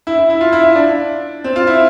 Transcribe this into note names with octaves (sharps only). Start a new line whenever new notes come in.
E4
E4
E4
F4
E4
E4
D4
C4
F4
E4